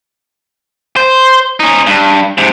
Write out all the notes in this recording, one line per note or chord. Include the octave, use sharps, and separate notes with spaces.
C5
C#4 D#4
G2
G#2 C3